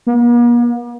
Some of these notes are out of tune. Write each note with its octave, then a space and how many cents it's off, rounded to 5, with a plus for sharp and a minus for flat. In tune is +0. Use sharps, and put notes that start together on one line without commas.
A#3 +45